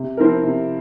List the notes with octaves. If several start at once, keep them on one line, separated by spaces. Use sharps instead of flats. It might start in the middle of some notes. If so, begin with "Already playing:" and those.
Already playing: C3
F3 C4 E4 A#4
C3